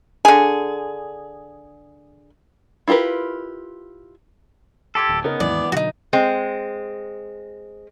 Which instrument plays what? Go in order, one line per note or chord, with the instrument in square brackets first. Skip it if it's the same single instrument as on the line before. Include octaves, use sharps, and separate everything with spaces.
[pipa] D3 G#4
[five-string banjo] E4 F4 G4 A#4 B4
[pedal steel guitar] G4 A4 [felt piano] C6 D6 G#6
[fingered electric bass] D1
[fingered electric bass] C#3 [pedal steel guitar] B3 [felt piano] C#4 D#4 A#4
[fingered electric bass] D#2 G#2 [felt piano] E3 [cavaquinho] D5
[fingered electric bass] B2 D3 F#3 [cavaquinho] D#4 F#4
[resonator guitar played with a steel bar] G#3 C4